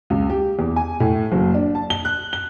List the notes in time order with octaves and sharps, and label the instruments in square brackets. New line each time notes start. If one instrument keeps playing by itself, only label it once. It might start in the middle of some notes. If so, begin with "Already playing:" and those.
[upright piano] C#2
G4
E2
G#5
A2
F#1
D4
A5
G7
F#6
G7